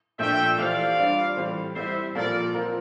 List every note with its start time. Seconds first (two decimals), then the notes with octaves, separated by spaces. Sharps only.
0.19 A#2 F3 A3 D4 E5 G5
0.58 E3 A3 E4 G4 C5 D5 F5
0.98 G3 D4 F4 C5
1.37 A2 E3 G3 C4
1.76 G3 C4 E4 C5 E5
2.15 A#2 F3 A#3 F4 A4 A#4 D5
2.54 F3 C4 F4 A#4